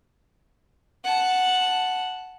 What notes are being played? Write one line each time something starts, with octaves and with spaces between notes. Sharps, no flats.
F#5 A5